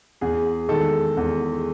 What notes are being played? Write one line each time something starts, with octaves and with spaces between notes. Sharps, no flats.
E2 G#4
D#3 G#3 A4
E2